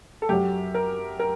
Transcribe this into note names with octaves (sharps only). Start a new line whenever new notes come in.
A4
F#2 F#3 G4
A#4
A#4